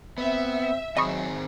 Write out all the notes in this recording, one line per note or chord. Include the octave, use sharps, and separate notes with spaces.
B3 C4 E5
D#3 F#3 C4 G#4 D#5 B5 C#6